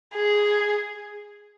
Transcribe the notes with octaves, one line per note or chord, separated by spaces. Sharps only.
G#4